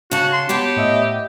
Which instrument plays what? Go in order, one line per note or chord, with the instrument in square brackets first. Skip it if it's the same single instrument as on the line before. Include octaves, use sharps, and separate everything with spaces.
[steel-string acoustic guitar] C#3 A5 [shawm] F#4
[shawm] C6
[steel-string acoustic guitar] B3 C#5 A5 [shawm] G4
[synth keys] A2 D#5 E5